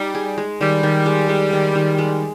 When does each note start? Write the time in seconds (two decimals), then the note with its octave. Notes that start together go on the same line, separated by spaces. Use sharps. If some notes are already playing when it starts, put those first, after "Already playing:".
Already playing: G3 D#4
0.15 G#4
0.38 G#3
0.60 D#3 G3
0.83 D#3
1.06 G#3
1.29 G#3
1.53 D#3
1.75 D#3
1.98 G#3